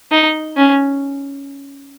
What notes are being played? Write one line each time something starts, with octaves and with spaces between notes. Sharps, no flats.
D#4
C#4